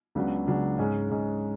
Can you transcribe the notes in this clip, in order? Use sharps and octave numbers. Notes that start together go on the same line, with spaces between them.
C#2 C#3 F#3 B3 D4
C#2 C#3 F#3 B3 D4
G#2 G#3 C#4
G#2 G#3 C#4